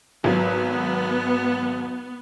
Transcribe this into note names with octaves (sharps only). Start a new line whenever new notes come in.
G#1 F#3 B3